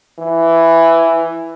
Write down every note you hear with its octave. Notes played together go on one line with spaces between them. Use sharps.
E3